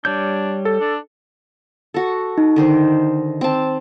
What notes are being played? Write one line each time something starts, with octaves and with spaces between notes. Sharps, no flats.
G3 D4 C#5 G6
A4
D4
F#4 A4
D#4
D3 D#3 C5
C4 A5